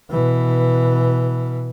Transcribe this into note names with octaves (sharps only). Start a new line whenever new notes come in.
B2 E3